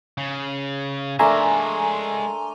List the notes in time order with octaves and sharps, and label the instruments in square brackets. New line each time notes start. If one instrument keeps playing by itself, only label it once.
[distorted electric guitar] C#3
[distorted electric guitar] G#3 E5 [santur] A3 D4 A#4 [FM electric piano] G#5 A#5 C6